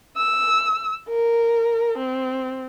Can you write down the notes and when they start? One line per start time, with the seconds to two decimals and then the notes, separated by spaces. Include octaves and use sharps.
0.17 E6
1.09 A#4
1.98 C4